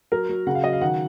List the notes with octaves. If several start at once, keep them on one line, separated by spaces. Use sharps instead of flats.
F#3 A#4
F#3
C#3 F#5
F5
F#3 D#5
F5
D#3 F#5